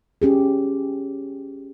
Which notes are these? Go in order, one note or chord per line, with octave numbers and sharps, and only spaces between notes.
C#4 G4 G#4